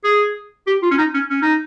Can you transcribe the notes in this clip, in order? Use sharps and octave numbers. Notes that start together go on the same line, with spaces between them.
G#4
G4
F4
C#4
D#4
C#4
C#4
D#4